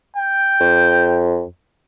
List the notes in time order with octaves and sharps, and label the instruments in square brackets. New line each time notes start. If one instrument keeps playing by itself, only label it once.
[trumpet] G5
[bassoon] F2